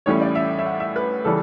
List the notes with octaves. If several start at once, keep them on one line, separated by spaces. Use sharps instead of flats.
A1 A2 G3 C#4 E4 C#5
D5
E5
E5
F#5
E5
B4
C#3 E3 G3 A4